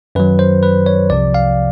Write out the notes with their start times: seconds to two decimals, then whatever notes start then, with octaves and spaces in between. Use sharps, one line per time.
0.15 F#2 D#3 F#3 B4
0.39 C5
0.63 B4
0.86 C#5
1.10 C2 C3 F3 D5
1.34 F5